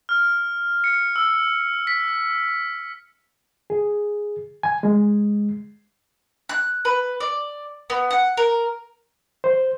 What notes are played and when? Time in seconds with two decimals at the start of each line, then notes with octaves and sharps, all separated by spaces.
0.09 F6
0.84 C#7
1.16 E6
1.87 B6
3.70 G#4
4.63 G#5
4.83 G#3
6.49 F#6
6.85 B4
7.20 D5
7.90 B3
8.11 F#5
8.37 A#4
9.44 C5